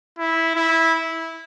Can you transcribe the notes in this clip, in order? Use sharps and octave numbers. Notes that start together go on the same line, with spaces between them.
E4
E4